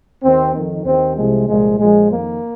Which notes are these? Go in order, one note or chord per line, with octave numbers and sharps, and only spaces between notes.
D#2 D#3 C4
F2 D#3
D#2 D#3 C4
C2 C3 F3 G#3
C2 A#2 F3 G#3
A#1 A#2 F3 G#3
F2 D#3 A#3